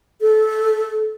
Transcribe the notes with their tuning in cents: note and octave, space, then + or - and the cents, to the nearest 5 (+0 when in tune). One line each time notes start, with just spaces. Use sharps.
A4 -20